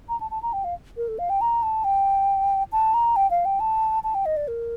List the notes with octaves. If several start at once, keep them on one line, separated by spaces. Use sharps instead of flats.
A#5
A5
A5
A#5
G5
F5
A#4
A4
F5
G5
A#5
A5
G5
A5
A#5
G5
F5
G5
A5
A5
G5
D#5
D5
A#4